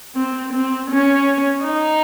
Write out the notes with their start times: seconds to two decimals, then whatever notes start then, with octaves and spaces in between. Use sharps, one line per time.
0.15 C4
0.53 C4
0.90 C#4
1.65 D#4